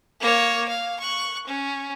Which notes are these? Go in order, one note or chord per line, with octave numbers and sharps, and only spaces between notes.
A#3 C#5
F5
C#6 F#6
C#4